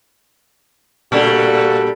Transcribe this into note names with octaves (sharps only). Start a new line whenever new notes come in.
A#2 G3 A#3 D4 F#4 A4